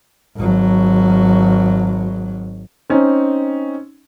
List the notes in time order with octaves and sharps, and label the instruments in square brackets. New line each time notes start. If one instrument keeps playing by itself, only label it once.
[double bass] G#1 F#3
[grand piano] C4 C#4 D#4